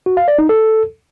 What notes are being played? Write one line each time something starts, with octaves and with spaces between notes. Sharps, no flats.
F#4
F5
D5
D#4
A4